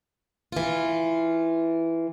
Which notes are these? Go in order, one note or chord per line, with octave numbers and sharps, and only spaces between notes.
E3 F4